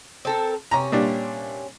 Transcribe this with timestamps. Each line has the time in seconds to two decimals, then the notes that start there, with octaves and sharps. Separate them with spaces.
0.25 C4 A4 A#4
0.71 C3 C#4 A#5
0.92 A#2 G3 D4